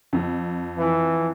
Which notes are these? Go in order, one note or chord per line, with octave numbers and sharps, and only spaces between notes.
F2
E3